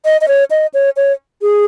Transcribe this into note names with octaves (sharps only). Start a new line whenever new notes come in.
D#5
D#5
C#5
D#5
C#5
C#5
G#4